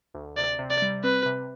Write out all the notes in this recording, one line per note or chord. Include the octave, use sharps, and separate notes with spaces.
D2
C3 D5
C3
D5
G3
C4 B4
C3